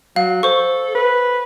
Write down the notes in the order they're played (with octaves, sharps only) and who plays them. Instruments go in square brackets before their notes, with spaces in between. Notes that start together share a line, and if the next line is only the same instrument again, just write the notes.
[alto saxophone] F#3 [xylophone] F5
[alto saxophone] A4 [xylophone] C5 C#6
[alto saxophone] B4